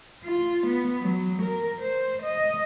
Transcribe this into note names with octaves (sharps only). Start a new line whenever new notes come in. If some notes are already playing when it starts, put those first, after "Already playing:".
F4
B3
F#3
A#4
C5
D#5